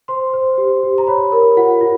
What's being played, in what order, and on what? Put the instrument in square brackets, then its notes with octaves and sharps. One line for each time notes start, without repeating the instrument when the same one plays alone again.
[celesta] C5 C6
C5
G4
G4
A#5
C#5 B5
A#4
F4 F#5
F4